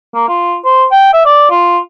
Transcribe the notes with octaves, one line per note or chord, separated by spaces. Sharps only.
A#3
F4
C5
G5
E5
D5
F4